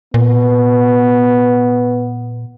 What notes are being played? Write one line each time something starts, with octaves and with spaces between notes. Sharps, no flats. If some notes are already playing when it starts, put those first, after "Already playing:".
A#2 B3